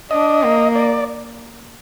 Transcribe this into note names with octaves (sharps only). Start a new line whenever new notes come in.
D4 D#5
A#3
D5